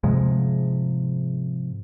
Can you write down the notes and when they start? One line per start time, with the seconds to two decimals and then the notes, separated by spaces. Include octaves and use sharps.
0.03 G#2 C3 F3 G#3